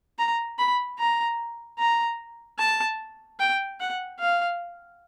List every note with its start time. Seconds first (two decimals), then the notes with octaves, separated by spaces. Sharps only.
0.19 A#5
0.58 B5
0.99 A#5
1.79 A#5
2.59 A5
3.40 G5
3.80 F#5
4.20 F5